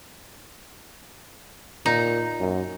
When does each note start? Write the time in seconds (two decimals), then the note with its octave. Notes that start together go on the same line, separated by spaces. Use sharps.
1.86 A#2 D#4
2.40 F#2